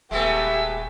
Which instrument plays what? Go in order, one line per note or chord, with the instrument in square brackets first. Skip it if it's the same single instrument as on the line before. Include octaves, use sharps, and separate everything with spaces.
[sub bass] D#1 [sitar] G#3 A3 B3 [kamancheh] G4 G#5 [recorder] E5